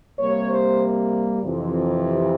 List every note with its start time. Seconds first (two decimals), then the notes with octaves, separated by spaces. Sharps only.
0.19 C3 G3 A#3 C#5
0.50 C5
1.44 F2 C3 E3